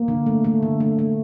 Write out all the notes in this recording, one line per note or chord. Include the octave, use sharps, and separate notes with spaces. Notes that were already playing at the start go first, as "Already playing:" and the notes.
Already playing: A#3
D3
A3
A3
D3
A3
A3